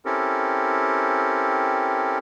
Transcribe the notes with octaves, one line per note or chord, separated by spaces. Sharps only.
C4 C#4 E4 G4 A4 A#4